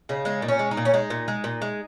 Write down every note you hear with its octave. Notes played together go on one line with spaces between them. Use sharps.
C#3 D#4
G#3 D#4
A#2
C#4
G#3
D#4
A#2
C#4
G#3 D#4
A#2
G#3
A#2
G#3